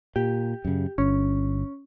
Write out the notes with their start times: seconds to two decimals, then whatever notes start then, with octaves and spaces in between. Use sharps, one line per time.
0.16 A#2 G4
0.65 F#2 C#3
0.98 G1 C#4